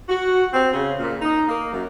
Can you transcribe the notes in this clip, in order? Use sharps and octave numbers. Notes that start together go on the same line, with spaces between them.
F#4
C4
C#3
A#2
D#4
A#3
F#2